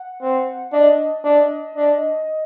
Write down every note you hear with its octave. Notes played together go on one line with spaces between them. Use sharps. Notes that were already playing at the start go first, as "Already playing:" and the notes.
Already playing: F#5
C4
D4 D#5
D4
D4